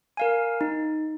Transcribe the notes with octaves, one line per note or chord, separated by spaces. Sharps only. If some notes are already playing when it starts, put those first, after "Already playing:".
A#4 F5 G#5
D#4